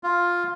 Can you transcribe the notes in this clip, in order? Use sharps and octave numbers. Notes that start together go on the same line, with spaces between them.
F4